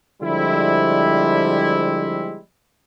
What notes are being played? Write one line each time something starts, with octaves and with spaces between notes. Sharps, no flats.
D3 F3 G3 G#3 C4 E4